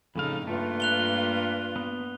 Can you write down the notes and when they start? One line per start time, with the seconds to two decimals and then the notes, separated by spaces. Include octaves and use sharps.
0.16 F2 A2 C#3 D#4 A4 F5 B5
0.47 G2 A3 A#3 F4 B4
0.80 F#6 F7 G7
1.76 B3